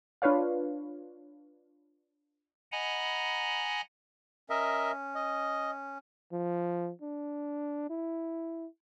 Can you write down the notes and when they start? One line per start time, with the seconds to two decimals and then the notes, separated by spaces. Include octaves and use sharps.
0.22 D4 F4 B4 C#5 F5
2.72 D#5 F#5 G#5 A#5 B5
4.50 C#4 A#4 D#5 E5
5.15 D#5
6.32 F3
7.02 D4
7.90 E4